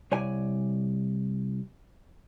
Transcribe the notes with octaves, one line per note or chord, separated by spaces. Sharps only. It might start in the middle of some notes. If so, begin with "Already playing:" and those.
C2 C#5 D5 G#5